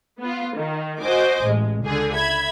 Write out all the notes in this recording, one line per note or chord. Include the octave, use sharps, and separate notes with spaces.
B3 F4
D#3
F#4 C5 D#5 G#5 D6
A1 G#3
C#2 D3 G#4
E5 B5 G#6